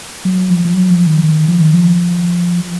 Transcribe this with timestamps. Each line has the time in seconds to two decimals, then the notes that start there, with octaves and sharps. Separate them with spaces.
0.25 F#3
0.50 F3
0.65 F3
0.74 F#3
0.90 F3
1.07 D#3
1.24 D#3
1.48 F3
1.61 D#3
1.74 F3